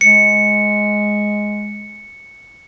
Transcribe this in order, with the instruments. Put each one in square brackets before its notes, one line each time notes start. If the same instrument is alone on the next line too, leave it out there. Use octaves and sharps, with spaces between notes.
[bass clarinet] G#3 [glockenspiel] C#7